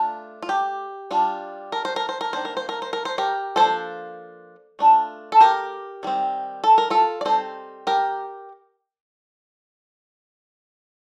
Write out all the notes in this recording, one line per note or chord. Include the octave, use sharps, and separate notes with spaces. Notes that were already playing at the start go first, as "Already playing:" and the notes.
Already playing: A3 D4 F4
F4
G4
G3 D4 F4
A#4
C5
A#4
C5
A#4
D#3 A#3 D4 C5
A#4
C5
A#4
C5
A#4
C5
G4 A#4
F3 A#3 D4 A4 C5
A3 D4 F4
A4
G4 A#4
D#3 G3 C4
A4
A#4
F4 A4
D5
G3 C4 D#4 A4 C5
G4 A#4